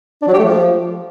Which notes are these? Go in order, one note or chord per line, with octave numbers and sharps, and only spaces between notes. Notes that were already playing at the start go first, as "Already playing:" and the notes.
D4
F#3
G4
A3
F3